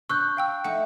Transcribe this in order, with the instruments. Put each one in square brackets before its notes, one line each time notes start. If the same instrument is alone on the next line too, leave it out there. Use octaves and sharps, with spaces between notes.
[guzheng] D4 [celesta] C#6 F#6 G6 [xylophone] E6
[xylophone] F5 G5 E6
[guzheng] A3 D#4 [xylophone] F#5